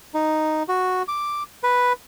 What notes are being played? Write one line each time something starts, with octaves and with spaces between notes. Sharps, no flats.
D#4
F#4
D6
B4